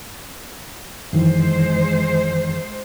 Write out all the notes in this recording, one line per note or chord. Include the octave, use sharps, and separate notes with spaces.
F#2 D#3 E3 G#3 C5